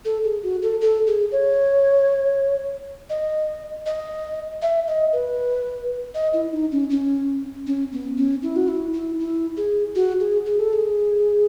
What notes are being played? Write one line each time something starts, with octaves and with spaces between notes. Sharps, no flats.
A4
G#4
F#4
A4
A4
G#4
C#5
D#5
D#5
E5
D#5
B4
D#5
E4
D#4
C#4
C#4
C#4
B3
C#4
E4
F#4
E4
E4
E4
G#4
F#4
G#4
G#4
A4
G#4